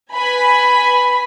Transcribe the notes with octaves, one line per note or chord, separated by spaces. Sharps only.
B4 G#5 B5